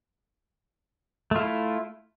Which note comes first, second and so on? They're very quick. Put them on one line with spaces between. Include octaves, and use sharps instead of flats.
A3 F4 E4